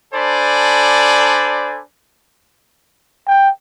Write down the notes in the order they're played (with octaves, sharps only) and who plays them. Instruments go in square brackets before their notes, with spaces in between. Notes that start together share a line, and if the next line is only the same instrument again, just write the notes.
[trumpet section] D4 A4 C5 D5 G#5 B5
[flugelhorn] G5